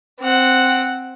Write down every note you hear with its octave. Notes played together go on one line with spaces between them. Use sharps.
C4 F#5